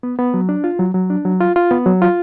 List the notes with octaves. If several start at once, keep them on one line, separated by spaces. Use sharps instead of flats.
B3
B3
F#3
D4
F4
F#3
F#3
D4
F#3
F4
F4
B3
F#3
F4